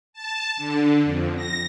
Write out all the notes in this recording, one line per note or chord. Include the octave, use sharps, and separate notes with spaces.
A5
D3
F2
A#6